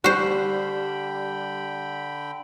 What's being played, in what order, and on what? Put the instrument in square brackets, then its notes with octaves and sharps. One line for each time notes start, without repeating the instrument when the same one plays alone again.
[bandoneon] D3 G5 B5 [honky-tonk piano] G3 [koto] F#4 C5